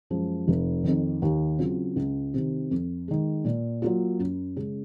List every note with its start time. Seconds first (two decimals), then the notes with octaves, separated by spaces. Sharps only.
0.10 F#2 F3 G#3
0.48 F1
0.84 F2 D#3
1.22 D#2
1.59 C#3 F#3 C4 F4
1.96 C#2
2.34 C3 D#3
2.71 F2
3.08 D#3 G#3
3.45 A#2
3.82 F#3 A#3 F4
4.19 F#2
4.56 C#3 G#3 C#4